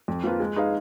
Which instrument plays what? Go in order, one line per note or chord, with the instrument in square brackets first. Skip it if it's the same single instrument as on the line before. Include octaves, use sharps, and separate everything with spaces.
[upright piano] F2
F3 A#3 F4 B4
G#3
D#4 G#4 B4 F5